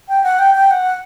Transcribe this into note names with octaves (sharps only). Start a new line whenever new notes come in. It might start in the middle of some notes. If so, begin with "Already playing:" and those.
G5
F#5
G5
G5
F#5